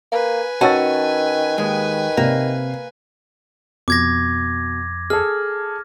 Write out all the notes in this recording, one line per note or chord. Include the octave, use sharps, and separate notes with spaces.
A#3 B4 G#5
D#3 C#4 F#4 A5 E6 A6
D#2 D#3 G#3
C3 A#3 D5
F2 B2 D6 G#6 A#6
G#4 A4 F6